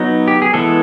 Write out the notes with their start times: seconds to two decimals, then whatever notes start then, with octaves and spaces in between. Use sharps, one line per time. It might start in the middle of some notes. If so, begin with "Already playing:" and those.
Already playing: F#3 B3 D#4
0.28 G4
0.42 G#4
0.54 E3 G#3 B3 A4